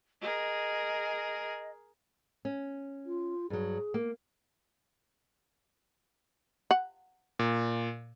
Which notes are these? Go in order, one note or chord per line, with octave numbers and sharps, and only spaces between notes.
G#4 A#4 D#5
C#4
F4
G2 F#3 G#4
A#3
F#5
A#2